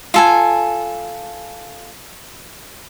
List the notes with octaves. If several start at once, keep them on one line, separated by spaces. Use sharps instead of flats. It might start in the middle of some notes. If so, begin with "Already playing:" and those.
F4 A4 G#5